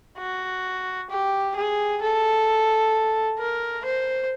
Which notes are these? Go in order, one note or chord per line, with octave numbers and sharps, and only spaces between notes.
F#4
G4
G#4
A4
A#4
C5